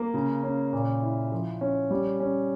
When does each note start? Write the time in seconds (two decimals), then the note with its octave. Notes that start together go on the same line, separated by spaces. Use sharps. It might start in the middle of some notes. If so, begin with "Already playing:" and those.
Already playing: A#3
0.14 C#3
0.43 C#4
0.73 A#2
1.02 E4
1.32 F3
1.61 C#4
1.91 G3
2.20 C#4